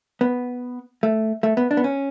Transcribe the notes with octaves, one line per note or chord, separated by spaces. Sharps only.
B3
A3
A3
B3
D4
B3
C#4